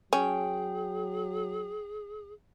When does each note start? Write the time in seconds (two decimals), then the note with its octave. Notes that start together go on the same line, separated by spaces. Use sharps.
0.13 F#3 C#4 G#4 G5